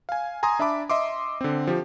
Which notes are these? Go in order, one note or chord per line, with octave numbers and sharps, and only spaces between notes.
F5 G#5
G#5 A#5 C6 D#6
D4 E5 A5 B5 D6
D#5 E5 C6 D6
D3 C4
F3 G4